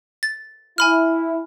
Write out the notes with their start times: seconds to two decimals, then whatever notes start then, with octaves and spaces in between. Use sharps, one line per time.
0.23 A6
0.78 E4 G#5 B5 F6